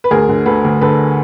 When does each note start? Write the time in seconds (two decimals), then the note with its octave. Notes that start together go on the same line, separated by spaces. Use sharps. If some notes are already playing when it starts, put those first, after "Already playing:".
0.04 B4
0.11 D2 G#4 A#4
0.29 D3
0.46 D2 A4 B4
0.65 D2
0.81 D3 A4 B4